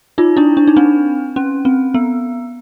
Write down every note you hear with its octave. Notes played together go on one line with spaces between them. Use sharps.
D#4 F4
D4 E4
D4
D#4
C4 D4
C#4
C4
B3